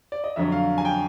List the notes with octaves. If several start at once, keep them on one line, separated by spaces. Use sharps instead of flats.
D5
D#5
F2 D3 F#3 E5
F5
G#5
G5